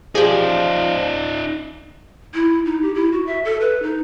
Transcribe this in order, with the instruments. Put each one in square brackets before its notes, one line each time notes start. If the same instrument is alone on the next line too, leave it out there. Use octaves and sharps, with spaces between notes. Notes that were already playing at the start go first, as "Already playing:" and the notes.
[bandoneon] F3 [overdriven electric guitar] D#4 D5 [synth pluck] G4 G#4
[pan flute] E4
D#4
G4
E4
F#4
E5
A4
B4
D#4